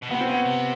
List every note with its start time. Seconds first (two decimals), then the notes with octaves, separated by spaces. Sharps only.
0.03 B2
0.10 C3 B3
0.20 C4
0.27 C#3 B3
0.45 C3